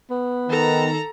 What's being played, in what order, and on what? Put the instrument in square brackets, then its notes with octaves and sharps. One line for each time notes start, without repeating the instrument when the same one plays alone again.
[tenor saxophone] B3
[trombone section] D#3 [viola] A4 A#5